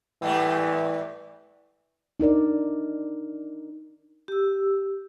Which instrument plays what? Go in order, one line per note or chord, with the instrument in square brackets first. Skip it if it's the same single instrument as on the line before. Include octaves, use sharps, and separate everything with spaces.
[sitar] G#2 G3 A3 [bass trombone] E3
[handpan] D4 D#4 A#4 D5
[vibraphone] G4 E6